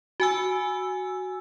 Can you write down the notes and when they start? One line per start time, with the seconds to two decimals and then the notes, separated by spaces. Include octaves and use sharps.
0.20 F#4 G#5 E6